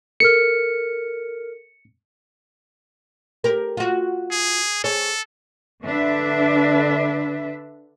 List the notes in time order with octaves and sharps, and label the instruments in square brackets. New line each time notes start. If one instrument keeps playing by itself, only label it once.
[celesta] A4 A#4 F6 [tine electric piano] C#7
[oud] G4 A#4
F4 F#4
[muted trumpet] G#4
[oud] G#4 C#5 [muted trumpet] A4
[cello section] D3 D4 B4 E5